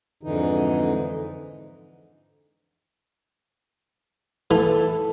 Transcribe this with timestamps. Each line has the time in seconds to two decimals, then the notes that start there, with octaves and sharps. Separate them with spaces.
0.23 F2 G#2 D3 E3 D#4
4.51 E3 A4